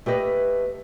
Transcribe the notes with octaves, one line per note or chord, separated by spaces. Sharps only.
A3 G4 B4 D#5